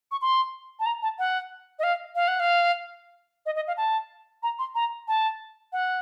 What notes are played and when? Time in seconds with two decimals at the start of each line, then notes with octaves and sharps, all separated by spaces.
0.11 C#6
0.21 C6
0.80 A5
0.86 A#5
1.02 A5
1.19 F#5
1.79 D#5
1.83 F5
2.15 F5
2.28 F#5
2.40 F5
3.46 D#5
3.56 D#5
3.67 F5
3.77 A5
4.43 A#5
4.59 C6
4.75 A#5
5.08 A5
5.73 F#5